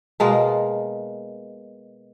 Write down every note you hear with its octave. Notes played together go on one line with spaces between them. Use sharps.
B2 G#3 A#3